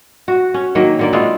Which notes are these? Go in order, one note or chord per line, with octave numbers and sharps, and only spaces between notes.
F#4
C#4
D#3 F#3 A#3
D3 A#3 D5
G#3 A3 B3 F4